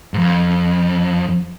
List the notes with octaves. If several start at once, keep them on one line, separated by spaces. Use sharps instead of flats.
F2 G#2